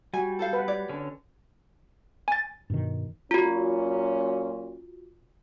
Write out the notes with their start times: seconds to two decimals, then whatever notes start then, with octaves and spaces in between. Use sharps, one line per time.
0.14 G3 F#4 G#5
0.39 A4 C5 F5
0.53 B4 F#5
0.68 G4 C#5 D5
0.89 D3 C#4
2.28 G#5 A6
2.70 G2 B2 D#3
3.31 A#2 F#3 C#4 F4 F#4